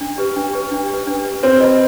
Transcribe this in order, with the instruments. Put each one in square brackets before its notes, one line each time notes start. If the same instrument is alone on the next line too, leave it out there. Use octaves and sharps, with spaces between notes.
[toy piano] D4
G4 B4
D4
G4 B4
D4
G4 B4
D4
G4 B4
[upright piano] C4 [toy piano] B4
[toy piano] D#5 B5